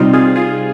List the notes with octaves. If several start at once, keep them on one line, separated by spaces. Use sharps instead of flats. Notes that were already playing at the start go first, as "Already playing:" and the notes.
Already playing: C3 G3 C4 D#4 F4
F4 G#4
F4 G#4